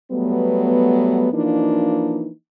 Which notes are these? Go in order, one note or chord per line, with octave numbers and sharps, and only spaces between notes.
F#3 G3 A3 B3
E3 F3 A#3 D4 D#4